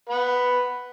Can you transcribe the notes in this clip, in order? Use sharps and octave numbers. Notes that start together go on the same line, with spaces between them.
B4 F#5